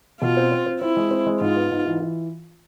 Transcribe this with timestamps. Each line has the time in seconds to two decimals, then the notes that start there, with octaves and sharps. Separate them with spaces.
0.21 B2 F4
0.37 C4
0.52 C4
0.66 C4
0.81 C4 E4
0.97 G#3
1.11 C4
1.27 G#3
1.41 G#2 F4
1.56 B3
1.71 G#2
1.86 E3
2.00 E3